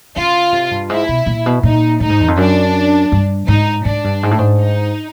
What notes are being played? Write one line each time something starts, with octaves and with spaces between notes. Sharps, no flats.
C#3 F4
C3
G2
G#2 E4
B2
A#2
B2
A#2 D#4
A2 D#4
G#2
E2
F2
F#2 D4
G2
G#2 D#4
G#2 D4
G2
G#2
A2
G#2
D#4